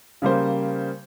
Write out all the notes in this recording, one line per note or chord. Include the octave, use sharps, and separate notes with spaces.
C#3 G3 A#3 C5